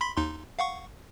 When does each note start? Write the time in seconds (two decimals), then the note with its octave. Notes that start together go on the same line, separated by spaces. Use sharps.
0.01 B5 C6 B6
0.17 D#2 D#4 C6
0.59 F5 F#5 C#6